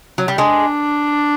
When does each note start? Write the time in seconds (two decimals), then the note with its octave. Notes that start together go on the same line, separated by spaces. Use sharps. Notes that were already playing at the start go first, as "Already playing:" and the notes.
0.18 F#3
0.28 G3
0.38 G#3 D4